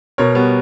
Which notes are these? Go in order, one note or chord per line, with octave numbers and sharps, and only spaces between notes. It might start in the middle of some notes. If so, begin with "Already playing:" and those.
B2 A#4 C#5
G3 B3